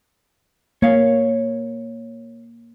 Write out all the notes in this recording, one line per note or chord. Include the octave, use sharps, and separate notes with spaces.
A#3 C#5 F5